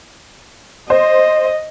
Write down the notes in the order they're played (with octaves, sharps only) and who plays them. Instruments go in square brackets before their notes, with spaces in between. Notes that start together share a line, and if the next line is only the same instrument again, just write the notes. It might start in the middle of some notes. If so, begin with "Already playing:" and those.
[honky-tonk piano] C5 [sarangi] D#5